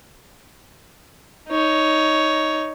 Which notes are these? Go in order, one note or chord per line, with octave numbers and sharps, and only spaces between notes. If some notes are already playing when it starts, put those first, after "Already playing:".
D#4 C#5